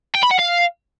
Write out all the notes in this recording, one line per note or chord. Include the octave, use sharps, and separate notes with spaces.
G5
B5
F#5
F5